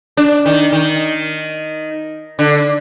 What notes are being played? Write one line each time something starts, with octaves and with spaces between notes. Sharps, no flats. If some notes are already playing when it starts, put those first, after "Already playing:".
D4
D#3
D#3
D3